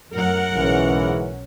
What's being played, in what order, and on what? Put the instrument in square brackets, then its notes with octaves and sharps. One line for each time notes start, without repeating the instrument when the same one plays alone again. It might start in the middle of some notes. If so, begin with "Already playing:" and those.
[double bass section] F#2 A2 F#3 [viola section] A#4 F#5
[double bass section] B1 C#4 [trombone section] G#2 C#3 E3